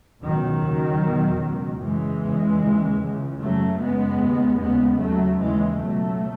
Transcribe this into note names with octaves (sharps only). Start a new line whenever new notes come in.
C#2 B2 D#3 F#3
D#2 C#3
E2 B2
C#2 B2
F#2 C#3 E3 G#3
E2 C#3
D#2 C#3
C#2 C#3
F#2 C#3 F#3 A3
F#2 C#3 G#3 B3
D#2 C#3
D#2 C#3 G#3 B3
D#2 C#3 F#3 A3
D#2 C#3 E3 G#3
C#2 B2 F#3 A3